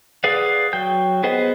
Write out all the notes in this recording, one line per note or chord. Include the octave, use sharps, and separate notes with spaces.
G#4 B4 D5 F5 F#5
F#3 G5 G6
B3 G#4 C5 D#5 F#5